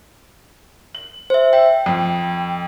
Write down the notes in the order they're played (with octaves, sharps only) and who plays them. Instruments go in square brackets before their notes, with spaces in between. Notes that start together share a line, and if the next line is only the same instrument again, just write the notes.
[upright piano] F#7
[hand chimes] C5 E5
[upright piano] E5 [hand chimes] G5
[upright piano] F2